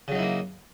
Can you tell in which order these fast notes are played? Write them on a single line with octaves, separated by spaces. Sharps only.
C#3 F#3 D#4 E4 A#3